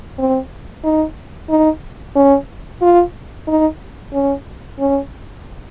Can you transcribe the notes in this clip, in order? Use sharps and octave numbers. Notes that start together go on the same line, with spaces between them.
C4
D#4
D#4
C#4
F4
D#4
C#4
C#4